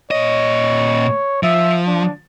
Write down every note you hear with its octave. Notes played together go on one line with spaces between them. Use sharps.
A#2 C#5 D#5
F3 E5
D4